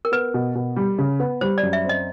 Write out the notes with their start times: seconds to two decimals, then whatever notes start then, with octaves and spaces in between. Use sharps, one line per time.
0.05 A#4
0.12 B3 B4
0.34 B2
0.55 B2
0.76 G3
0.99 C#3
1.20 B3
1.41 G3 C5
1.58 F#2 D5
1.73 E5
1.84 C4
1.89 D#5